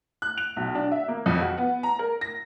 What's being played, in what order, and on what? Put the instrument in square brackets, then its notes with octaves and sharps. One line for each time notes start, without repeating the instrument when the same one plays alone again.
[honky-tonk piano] F#6
F7
B1
D4
E5
A#3
F2
F#4
B3
A#5
A#4
A#6